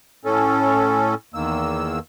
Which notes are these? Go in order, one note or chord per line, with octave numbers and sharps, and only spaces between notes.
A2 C#4 A4
E2 D#3 A#3 E6